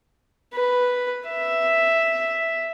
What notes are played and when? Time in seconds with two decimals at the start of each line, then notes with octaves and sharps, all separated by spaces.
0.54 B4
1.28 E5